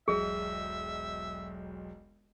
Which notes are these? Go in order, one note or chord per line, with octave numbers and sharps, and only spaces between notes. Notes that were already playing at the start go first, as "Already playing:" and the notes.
E1 B1 G#4 D#5 E5